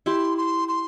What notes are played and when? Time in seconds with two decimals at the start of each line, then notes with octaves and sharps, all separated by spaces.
0.06 E4 G4 C6
0.37 C6
0.68 C6